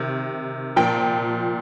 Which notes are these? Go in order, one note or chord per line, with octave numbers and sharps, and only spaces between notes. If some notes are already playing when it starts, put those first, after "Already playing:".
Already playing: C3 D#3
A#2 F3 G5